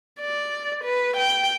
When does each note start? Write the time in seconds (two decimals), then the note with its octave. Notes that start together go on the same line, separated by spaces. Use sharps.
0.20 D5
0.84 B4
1.17 G5